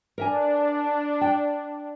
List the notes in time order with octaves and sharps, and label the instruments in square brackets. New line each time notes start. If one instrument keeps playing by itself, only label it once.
[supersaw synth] D4 [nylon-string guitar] A#4 E5 G#5
[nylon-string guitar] G5